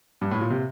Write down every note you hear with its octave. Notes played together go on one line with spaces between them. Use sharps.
G2
A2
A#2
C3